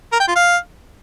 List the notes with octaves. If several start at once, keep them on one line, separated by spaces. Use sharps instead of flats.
A#4
G5
F4
F5